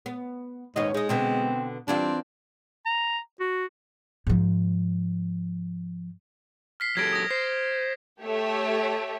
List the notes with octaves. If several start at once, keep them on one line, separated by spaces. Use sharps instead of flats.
B3
D#2 G#2 B3 C#4 D#5
G#3 D#4 G#4 D#5
B2 D3 B3 C4
E3 G3 C4 D4 F4
A#5
F#4
G#2 F3
F6 B6 C7
F#3 G4 A4 G#6 A#6 D7
D#6 A#6
C5 C7
A3 G4 C#5 E5